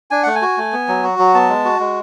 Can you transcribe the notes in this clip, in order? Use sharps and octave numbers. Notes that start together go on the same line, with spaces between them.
D4 G#5
A3 F#5
G#5
F#4
A3
B3
F#3
F#4
F#3
B3 A5
G#3
F#4
G#3